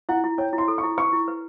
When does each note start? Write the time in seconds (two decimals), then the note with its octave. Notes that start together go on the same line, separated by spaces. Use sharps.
0.09 E4 F#5
0.24 E4
0.38 C#5 G5
0.53 E4
0.58 C6
0.68 A4
0.78 C#6
0.83 E4
0.98 B4 C#6
1.13 E4
1.28 B4